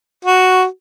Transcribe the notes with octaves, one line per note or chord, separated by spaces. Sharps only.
F#4